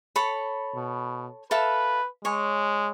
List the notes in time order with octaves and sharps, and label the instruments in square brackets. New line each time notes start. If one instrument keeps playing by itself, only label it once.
[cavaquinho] A4 C#5 B5
[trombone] B2
[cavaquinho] A4 E5 F5 [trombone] B4
[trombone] G#3 [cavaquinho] C#5 G#5